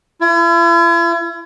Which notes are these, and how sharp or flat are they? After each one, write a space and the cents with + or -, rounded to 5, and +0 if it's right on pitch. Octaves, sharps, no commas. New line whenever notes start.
E4 +45